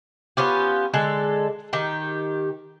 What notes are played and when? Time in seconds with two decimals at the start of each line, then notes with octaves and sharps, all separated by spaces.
0.37 B3 C#4 F4 G4
0.94 D3 G#3 A4
1.73 D#3 G4